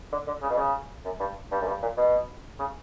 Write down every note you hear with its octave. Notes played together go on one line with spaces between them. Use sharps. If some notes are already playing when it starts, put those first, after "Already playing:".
D3
D3
C#3
B2
C#3
F#2
G2
G2
F#2
G2
A#2
B2
C#3